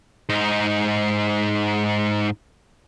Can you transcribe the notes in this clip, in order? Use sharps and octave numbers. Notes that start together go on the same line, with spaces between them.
G#2 D#4